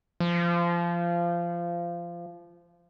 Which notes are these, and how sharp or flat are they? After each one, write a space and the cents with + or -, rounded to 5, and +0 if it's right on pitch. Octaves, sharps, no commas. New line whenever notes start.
F3 -20